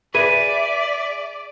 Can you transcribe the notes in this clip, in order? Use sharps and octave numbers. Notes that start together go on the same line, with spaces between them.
G#4 B4 D5 E5 D#7